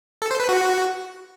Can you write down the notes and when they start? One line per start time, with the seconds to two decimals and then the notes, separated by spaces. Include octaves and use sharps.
0.22 A4
0.31 C5
0.40 B4
0.49 F#4